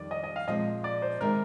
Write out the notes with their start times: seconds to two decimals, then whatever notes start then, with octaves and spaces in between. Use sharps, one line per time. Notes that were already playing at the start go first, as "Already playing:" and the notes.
Already playing: F2 D#3 G3 D4 D5
0.11 D#5
0.24 D#5
0.36 F5
0.48 A#2 F3 G#3 C4 D#5
0.84 D5
1.02 C5
1.21 C3 D#3 G#3 A#4